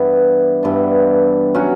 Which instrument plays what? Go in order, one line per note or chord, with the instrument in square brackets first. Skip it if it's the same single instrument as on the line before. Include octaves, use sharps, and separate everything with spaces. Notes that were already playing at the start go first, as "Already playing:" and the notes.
Already playing: [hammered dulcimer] G2 E3 B3 D4
G2 E3 B3 D4
F#3 C#4 F#4